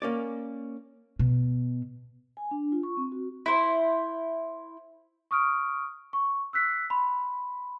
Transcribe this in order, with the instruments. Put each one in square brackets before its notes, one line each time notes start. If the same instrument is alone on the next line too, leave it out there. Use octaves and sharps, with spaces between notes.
[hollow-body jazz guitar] A#3 C#4 D5
[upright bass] B2
[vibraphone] G#5
D4
F4
C#6
C4
F#4
[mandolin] E4 C5
[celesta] C#6 D#6 F6 D7
C#6
E6 F#6 B6 C7
B5 C6